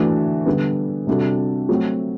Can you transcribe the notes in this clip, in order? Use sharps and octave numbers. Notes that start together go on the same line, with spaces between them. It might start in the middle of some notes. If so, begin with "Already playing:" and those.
Already playing: E3 A3 D4 F#4
D3 G3 B3
C3 G3 D4 F#4 A4
F#3 A3 C4 F#4